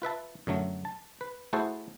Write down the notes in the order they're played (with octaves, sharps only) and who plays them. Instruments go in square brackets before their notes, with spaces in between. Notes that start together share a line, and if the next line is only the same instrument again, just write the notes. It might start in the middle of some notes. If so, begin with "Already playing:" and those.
[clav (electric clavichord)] F4 B4 E5 A5
F#2 D3 F#3 A3
A5
B4
A3 E4 F#4 G#4 A4 C5